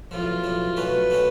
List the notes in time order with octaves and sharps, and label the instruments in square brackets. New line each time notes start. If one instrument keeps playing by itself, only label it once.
[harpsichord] B1 A2 F3 [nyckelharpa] F4
[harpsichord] B1 A2 F3
[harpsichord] B1 B2 A3 C#4 F#4 [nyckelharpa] B4
[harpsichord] B2 A3 C#4 F#4